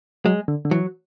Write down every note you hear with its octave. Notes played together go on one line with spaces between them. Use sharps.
F#3 G#3
D3
D3
E3 F#3